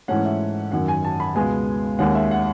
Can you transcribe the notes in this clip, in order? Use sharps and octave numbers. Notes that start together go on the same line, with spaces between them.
G#2 E3 A3 C#4 F#5
E5
F#2 D#3 F#3 F#5
G#5
A5
B5
C#2 B2 G#3 B3 G#5
D#2 D#3 G#3 C#4 F#5
E5
F#5